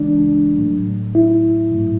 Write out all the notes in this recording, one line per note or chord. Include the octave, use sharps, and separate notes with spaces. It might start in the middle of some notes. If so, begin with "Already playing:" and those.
Already playing: C#2 C#3 E3 G#3 D4
A2 F#3 A3
E4
G#2 F#3 A3